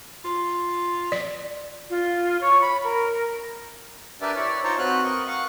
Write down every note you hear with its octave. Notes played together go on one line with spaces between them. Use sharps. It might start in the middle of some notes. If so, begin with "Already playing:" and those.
F4
D5
F4
C#5
B5
A#4
D4 G4 A#4 B4 D5 E5
E4 C#5 D5
D#4 F4 C5 C#5 A5 A#5
C4 F#4 B4 F6 F#6
A#4 D#5 C#6
F5 F#5 C#6